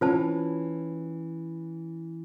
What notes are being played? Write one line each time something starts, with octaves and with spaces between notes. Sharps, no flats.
E3 C#4 F4 C5 A5